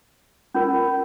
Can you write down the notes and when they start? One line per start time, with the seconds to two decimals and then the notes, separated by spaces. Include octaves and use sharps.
0.54 C#4 F4 A#4